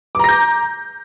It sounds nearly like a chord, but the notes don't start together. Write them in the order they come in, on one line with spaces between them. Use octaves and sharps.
D6 A#5 A#6 G6